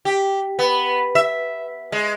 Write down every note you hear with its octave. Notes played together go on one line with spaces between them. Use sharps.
G4
B3
E5
G#3